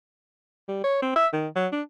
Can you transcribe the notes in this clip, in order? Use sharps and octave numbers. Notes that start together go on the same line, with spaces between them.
G3
C#5
C4
E5
D#3
F#3
D4